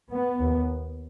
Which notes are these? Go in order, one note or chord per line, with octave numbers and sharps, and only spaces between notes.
B3
D#2